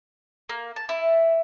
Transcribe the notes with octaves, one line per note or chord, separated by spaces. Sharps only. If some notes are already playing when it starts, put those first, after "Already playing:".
A#3
A5
E4